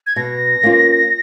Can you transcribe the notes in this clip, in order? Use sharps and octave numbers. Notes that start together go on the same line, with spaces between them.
G#6
B2 A#6
A#3 C#4 F4